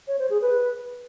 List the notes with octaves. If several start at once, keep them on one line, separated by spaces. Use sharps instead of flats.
C#5
C5
G#4
B4